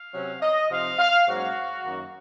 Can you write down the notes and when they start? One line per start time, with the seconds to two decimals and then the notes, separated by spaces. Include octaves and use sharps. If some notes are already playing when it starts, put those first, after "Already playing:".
Already playing: F5
0.14 C3 F#3 C#4
0.42 D#5
0.70 C3 F3 C4 D#4 F5
0.99 F5
1.27 G#2 F#3 A#3 C#4 F#4
1.84 F#2 D#3 A#3